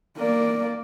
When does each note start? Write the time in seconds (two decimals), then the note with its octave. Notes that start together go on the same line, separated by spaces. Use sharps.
0.18 A#3 D5